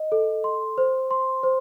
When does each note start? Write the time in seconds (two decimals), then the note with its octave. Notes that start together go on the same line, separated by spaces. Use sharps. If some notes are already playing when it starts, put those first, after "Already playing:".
Already playing: D#5
0.12 A4
0.44 C6
0.78 C5
1.11 C6
1.43 C5